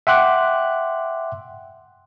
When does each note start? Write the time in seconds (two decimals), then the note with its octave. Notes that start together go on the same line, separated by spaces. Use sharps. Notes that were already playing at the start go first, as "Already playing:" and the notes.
0.07 E5 F#5 G5 C6 D6 F#6